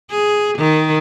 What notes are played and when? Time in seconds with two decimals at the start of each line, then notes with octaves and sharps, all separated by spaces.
0.10 G#4
0.58 D#3